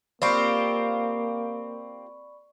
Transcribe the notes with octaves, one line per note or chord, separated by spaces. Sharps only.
A#3 C4 F4 G4 D5 B5 C#6